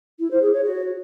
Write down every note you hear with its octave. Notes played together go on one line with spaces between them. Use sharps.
E4
C5
G#4
C#5
F#4